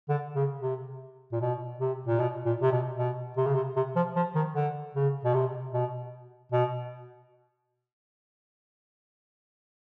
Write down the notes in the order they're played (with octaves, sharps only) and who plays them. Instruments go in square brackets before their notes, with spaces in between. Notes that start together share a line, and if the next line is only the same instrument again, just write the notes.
[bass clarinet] D3
C#3
C3
A#2
B2
C3
A#2
B2
A#2
C3
B2
B2
C3
C#3
C3
C3
F3
F3
D#3
D3
C#3
B2
C3
B2
B2